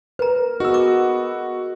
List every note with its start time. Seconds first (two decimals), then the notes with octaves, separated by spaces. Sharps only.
0.19 A#4 B4 A#5
0.60 B3 D#4 F#4 G#4 D#5 E6
0.74 D6